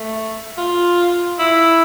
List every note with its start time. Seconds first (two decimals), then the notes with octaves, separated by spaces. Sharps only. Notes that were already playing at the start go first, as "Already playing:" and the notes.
Already playing: A3
0.58 F4
1.39 E4